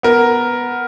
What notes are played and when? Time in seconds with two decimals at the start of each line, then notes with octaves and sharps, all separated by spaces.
0.03 B3 A#4